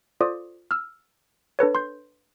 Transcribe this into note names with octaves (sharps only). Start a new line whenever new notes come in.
F4 A4 C5 D5 D6 D#6
E6 F6
D4 A4 B4 C#5
C6 G6